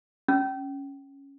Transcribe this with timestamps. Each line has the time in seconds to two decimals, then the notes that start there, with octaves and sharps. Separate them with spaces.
0.28 C#4